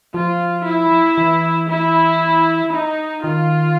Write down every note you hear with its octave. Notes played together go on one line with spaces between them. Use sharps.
F3 F4
E4
E3
E4
D#4
D#3 F4